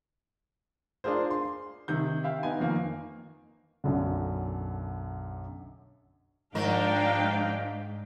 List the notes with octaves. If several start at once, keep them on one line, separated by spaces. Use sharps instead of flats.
D4 F4 G#4 A#4 C5
C6
C3 D#3 G6
E5 F5 G5
B3 D#4 G#5
F2 D#3 A#3
B1 F#2 D3
G#2 D#3 F3 D4 A#4 F5 G5